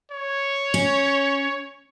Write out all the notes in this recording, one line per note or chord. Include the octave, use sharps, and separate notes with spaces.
C#5
C#4